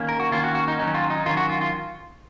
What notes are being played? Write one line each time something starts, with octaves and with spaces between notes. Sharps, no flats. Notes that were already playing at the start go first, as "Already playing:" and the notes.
Already playing: D#3 A#3 C#4
A#4
F#4
D#3 A#3 C#4 F4
F#4
F#4
D#4
D#3 F#3 C#4 D#4
F4
D#4
D#3 F#3 C#4 F4
F#4
F4
F4